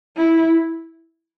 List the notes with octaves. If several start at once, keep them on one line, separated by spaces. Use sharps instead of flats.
E4